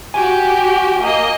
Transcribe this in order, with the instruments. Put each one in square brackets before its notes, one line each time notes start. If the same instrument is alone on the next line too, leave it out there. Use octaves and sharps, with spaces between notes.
[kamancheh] F#4 G4 [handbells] G#5
[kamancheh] A#3 D#5